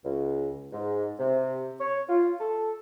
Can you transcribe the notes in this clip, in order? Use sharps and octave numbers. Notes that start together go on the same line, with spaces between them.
C#2
G#2
C3
C#5
F4
A4